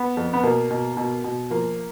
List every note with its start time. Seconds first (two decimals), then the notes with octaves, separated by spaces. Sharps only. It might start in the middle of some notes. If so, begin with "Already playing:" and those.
Already playing: B3
0.17 F2
0.33 B3
0.43 B2 A#3
0.71 B2
0.97 B2
1.24 B2
1.50 F3 A#3